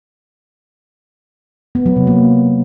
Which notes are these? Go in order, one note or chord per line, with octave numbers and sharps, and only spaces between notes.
B3
F#3
C3
A#3